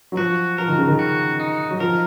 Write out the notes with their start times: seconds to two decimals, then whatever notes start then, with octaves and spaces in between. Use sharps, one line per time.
0.12 F#3
0.17 F3 F#4
0.58 F3 A#4
0.68 D#3
0.78 C#3
0.87 D#3
0.99 F#4
1.40 D#4
1.71 F#3
1.80 F3 A#4